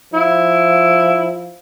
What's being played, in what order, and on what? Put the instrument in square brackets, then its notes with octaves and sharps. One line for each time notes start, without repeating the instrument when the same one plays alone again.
[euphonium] F3 [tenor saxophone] E4